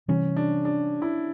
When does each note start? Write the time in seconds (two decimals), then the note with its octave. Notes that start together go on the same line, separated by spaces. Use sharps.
0.08 C3 E3 G3 C#4
0.36 D4
0.65 D4
1.02 E4